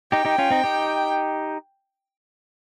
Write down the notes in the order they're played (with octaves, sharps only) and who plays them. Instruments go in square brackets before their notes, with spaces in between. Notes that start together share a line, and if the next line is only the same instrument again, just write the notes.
[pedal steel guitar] D#4 G4 [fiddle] G5
[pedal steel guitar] D#4 G4
C#4 F4
C4 D#4
D#4 G4